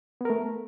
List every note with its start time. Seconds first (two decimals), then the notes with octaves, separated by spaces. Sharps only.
0.21 B3
0.25 A#4
0.30 A3